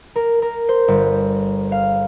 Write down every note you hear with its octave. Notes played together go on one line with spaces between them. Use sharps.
A#4
A#4
C5
G1
F5